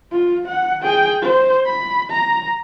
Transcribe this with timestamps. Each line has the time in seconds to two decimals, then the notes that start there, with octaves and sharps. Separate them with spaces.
0.12 F4
0.48 F#5
0.82 G#4 G5
1.21 C5
1.66 B5
2.11 A#5